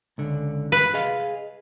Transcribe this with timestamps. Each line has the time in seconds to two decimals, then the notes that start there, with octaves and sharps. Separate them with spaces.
0.18 C#2 D3
0.72 B4
0.94 G#4 D#5 F5